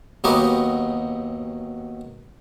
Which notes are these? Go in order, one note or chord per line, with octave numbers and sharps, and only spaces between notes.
D#2 F#3 B3 F#4 G4 D#5